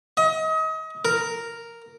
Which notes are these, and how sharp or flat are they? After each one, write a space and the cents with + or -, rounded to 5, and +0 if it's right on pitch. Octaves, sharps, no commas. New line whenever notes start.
D#5 +35
A#4 -5